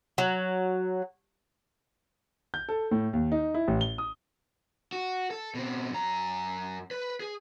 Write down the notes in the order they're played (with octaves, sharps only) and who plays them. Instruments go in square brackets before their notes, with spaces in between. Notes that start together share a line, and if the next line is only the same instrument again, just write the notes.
[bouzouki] F#3
[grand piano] G6
A4
A2
D#2
D#4
E4
A1
G7
D#6
[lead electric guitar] F#4
A4
B2 C4
F#2 A#5
B4
G#4